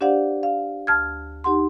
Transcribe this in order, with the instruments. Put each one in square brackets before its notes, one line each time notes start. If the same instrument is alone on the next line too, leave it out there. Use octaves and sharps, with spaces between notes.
[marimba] D4 G4 C5 D5 F5 F#5
F5
D2 A5 F6 G#6
D#4 G4 F#5 C6